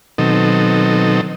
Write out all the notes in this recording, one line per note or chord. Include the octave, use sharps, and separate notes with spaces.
B2 D#3 F#3 C4 D#4 A4